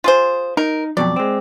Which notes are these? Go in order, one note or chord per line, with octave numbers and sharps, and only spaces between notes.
F4 G#4 C5
D#4 A#4
F2 B2 F#3 D5
G#3 C4